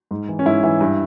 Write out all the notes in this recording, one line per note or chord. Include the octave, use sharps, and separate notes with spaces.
G#2
E3
C#4
G#2 E4
E3 E4
G2